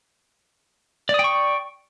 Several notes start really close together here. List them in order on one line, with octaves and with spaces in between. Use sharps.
D5 D#6 G5 C#6